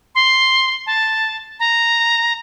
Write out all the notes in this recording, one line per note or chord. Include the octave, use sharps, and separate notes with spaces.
C6
A5
A#5